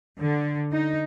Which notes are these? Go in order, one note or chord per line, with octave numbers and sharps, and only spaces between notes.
D3
D#4